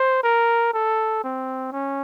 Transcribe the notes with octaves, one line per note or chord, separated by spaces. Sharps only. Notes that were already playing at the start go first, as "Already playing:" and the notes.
Already playing: C5
A#4
A4
C4
C#4